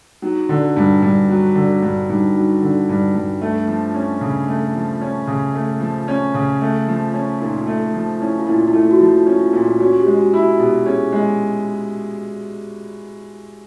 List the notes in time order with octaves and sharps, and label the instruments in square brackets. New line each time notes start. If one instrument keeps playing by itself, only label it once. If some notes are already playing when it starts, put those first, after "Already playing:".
[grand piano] F#3 [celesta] D#4
[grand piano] D3
G2
G2
F#3
D3
G2
[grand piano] G2 [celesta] D#4
[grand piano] F#3 [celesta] D#4
[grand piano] D3 [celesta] D4
[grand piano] G2
G2
A3
F3
C#4
C#3
A3
F3
C#4
C#3
A3
F3
C#4
C#3
A3
F3
C#4
[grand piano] A#2 [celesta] D#4
[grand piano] A3
F3
[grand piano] C#4 [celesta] E4
[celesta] F4
[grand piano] A#2 [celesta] E4
[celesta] E4
[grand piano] A3 [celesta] F4
[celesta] F#4
[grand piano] F3 [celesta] F4
[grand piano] C#4
[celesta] F4
[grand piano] A#2
[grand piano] C#4 [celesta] F#4
[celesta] G4
[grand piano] G#3
[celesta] F#4
[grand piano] E4
[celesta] F#4
[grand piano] B2 [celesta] G4
[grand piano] C#4 [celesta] G#4
[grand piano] G#3